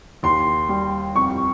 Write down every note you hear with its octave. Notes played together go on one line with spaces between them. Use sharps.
D#2 C6
G3
F2 C#6